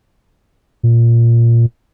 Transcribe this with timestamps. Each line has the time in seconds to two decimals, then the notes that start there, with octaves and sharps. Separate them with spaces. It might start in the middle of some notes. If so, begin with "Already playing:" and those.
0.83 A#2